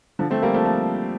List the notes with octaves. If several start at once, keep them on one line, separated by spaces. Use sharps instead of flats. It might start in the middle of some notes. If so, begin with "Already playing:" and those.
D3 F3
A3 C4
G3 A#3
F3 A3
F3 A3